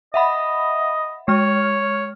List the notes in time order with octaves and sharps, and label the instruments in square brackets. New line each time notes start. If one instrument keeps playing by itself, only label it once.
[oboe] D#5 [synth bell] E5 F#5 B5
[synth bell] G#3 F6 [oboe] C#5